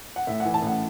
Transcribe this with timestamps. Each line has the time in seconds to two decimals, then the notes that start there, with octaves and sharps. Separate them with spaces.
0.16 F#5
0.27 A2 E5
0.40 E3 F#5
0.54 A5
0.62 A2 F#5